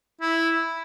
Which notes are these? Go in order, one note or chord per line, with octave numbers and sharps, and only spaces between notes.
E4